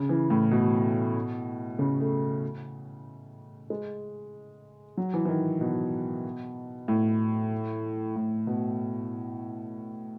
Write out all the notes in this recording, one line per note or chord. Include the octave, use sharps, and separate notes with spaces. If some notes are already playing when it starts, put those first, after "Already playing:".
Already playing: C#3
E3
A2
B2
C#3
A3
G#3
F#3
E3
E3
D#3
B2
A2
A2
B2